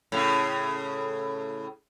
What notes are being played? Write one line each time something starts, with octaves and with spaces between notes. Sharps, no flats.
A2 C#3